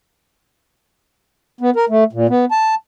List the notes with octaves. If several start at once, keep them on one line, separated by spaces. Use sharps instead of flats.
B3
A#4
A3
A#2
B3
A5